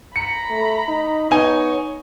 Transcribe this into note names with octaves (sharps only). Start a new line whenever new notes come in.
A#5 B5 C#7
A3
D#4
B3 D#4 C#5 G#5